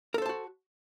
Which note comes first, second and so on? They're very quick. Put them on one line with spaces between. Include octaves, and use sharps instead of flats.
A#4 A4 C5 A5 F#4